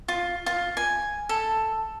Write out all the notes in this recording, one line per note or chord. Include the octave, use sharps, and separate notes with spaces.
F4
F4
G#5
A4